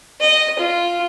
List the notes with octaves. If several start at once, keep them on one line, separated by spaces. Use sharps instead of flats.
D#5
F4